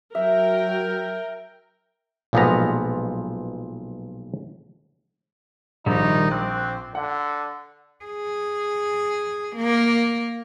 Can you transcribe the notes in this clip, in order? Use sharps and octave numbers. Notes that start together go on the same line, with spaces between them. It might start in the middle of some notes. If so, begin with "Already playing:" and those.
F#3 A#4 E5 G5
B1 A#2 F3 G#3 B3 A#5
A#1 D#3 G3 D#4
C4 D6 F#6
D3 F#5
G#4
A#3